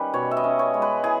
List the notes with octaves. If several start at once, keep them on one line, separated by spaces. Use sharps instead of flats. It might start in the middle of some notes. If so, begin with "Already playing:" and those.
Already playing: D#3 G3 C#4 B4
B2 C#5
E5
D#5
C#4
C#5
G#3
B4
E3 G#4